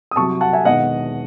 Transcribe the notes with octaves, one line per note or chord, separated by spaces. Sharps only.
D#6
C2 C3 F#3 A5 C#6
F#5 A5
E5 G#5
E1 E2 D#3 D#5 F#5